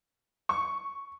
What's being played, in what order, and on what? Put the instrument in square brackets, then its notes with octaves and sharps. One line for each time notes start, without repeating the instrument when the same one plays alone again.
[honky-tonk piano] C#6